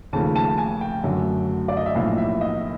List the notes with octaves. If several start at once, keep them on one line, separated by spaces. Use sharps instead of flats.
D#2 C#3 F3 A3 A5
A5
G#5
G5
F#2 D3 F#3 A3
D5
D#5
E5
B1 A2 F3 A#3 F5
E5
D#5